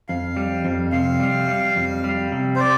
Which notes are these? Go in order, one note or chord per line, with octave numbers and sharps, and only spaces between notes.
F2 F5
G3
F2
C3 F5
G3
G3
F2
G3
C3
C5
D5